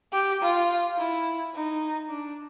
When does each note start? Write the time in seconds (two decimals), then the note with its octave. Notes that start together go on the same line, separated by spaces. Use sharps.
0.12 G4
0.41 F4
0.97 E4
1.54 D#4
2.09 D4